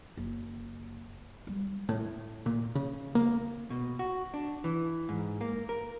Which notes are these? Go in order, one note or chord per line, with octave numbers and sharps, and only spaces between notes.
F#1
G3
A2
A#2
C#3
A#3
B2
F#4
D4
E3
G#2
A#3
A#4